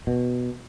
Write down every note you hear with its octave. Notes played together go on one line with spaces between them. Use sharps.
B2